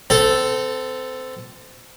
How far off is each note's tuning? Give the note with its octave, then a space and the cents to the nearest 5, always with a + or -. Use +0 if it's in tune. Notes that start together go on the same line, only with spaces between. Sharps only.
C4 -25 A4 +0